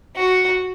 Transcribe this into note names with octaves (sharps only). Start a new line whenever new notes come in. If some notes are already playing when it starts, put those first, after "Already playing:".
F#4